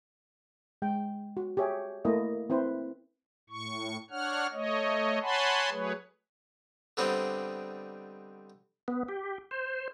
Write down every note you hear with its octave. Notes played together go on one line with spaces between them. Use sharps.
G#3 G5
F#4
G4 G#4 C#5 E5 G#5
A3 A#3 E4 D#5
C4 E4 B4 C5
A2 C#6
D4 C#5 F#5 F6
A3 C#5 D#5
C#5 F#5 G#5 A5 B5 C6
F#3 A3 G#4 B4 C#5
D3 G3 B3 C4 D4 D#4
B3
G4
C5